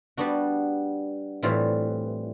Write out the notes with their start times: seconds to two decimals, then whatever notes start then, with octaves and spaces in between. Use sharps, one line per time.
0.17 G3 B3 D4 F#4
1.43 A2 E3 G3 C4 F4